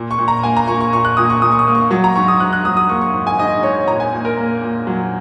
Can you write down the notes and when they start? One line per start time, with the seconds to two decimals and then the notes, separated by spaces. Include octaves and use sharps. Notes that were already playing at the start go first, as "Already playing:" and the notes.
Already playing: A#2
0.11 C#6
0.18 A#2
0.28 A#5
0.43 A#3 G#5
0.57 A#5
0.68 A#2 C#6
0.81 C#6
0.93 A#2 C#6
1.05 F#6
1.17 A#2 D#6
1.30 C#6
1.42 A#2 D#6
1.52 C#6
1.59 D#6
1.67 A#3
1.75 C#6
1.91 F#3 C#6
2.04 A#5
2.16 G#2 C#6
2.28 D#6
2.40 G#2 F#6
2.53 F#6
2.65 F#3 D#6
2.77 D#6
2.89 A#3 C#6
3.01 C#6
3.14 G#2
3.27 G#5
3.39 G#2 D#5
3.63 G#2 C#5
3.88 A#2 A#5
4.00 G#5
4.12 A#2
4.25 A#4
4.37 A#3
4.62 A#2
4.87 F#3